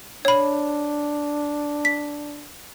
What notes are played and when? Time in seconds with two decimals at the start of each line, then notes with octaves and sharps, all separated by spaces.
0.25 D4 C#5 B5
1.85 B6